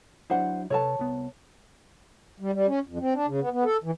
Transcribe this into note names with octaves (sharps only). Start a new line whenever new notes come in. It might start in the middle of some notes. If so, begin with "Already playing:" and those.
F#3 D4 E4 C5 F#5
C3 A4 B4 C#5 A5
C2 B3
G3
G3
C#4
F2
C4
D4
C#3
B3
B3
A4
E3